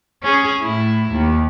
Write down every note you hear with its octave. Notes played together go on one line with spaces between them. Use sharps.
C#4 G#4
A2 E4
D#2